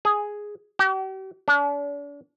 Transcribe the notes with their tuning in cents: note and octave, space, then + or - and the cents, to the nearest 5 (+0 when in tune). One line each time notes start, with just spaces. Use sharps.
G#4 +0
G4 -45
D4 -40